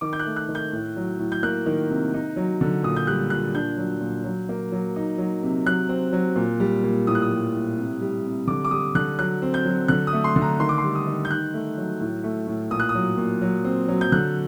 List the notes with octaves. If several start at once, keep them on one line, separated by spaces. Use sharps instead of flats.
D#3 D6
G6
F#6
A3
F#6
D#3
G6
A2
F#3
A2
G6
A#3 F#6
D#3
C3
D#4
F#3
D3
A#2 D#6
G6
G3 F#6
A#2 F#6
D4 G6
F#3
A#2
F#3
A#3
F#3
D#4
F#3
C3
F#3 F#6
C4
F#3
A#2
G3
A#2
A2 D#6
F#6
D#6
G3
A2
C3
G3
C3
D3 D6
D6
G3 D#6
D3 F#6
F#3 F#6
C4
G6
F#3
D3 F#6
D#6
A3
C6
D3
A#5
D#3 C6
D6
C6
G3
D#6
D#3
G6
D#4 F#6
A3
F#3
A2
A3
A2
A#2 D#6
F#6
D#6
F#3
A#2
F#3
C4
F#3
G6
D3 F#6